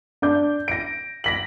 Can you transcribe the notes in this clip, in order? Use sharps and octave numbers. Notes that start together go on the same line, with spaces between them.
D4 D6 G6
A#6 D7
A#6 B6 F#7